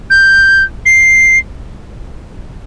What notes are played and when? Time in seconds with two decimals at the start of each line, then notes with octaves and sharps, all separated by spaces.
0.10 G6
0.86 C7